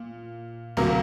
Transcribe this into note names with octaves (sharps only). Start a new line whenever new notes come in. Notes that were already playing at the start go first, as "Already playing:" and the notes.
Already playing: A#2
D2 C3 F#3 A#3 A#4 A#5